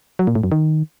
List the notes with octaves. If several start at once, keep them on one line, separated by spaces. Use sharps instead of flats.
F#3
A#2
A2
F#2
D#3